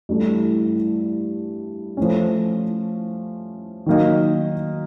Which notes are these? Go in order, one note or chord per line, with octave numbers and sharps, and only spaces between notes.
G2 E3 A3 C#4 E4
F3 A3 C#4
D#3 F#3 A#3 D#4